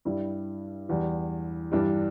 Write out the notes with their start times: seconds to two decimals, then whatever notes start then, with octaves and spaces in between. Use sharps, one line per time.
0.05 G2 G3 E4
0.89 E2 E3 G3
1.72 G2 E3 G3 D4